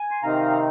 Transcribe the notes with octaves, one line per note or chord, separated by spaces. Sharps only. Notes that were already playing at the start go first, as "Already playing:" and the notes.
Already playing: G#5
C6
C3 D#3 C4 D#4 F5 A#5
A#5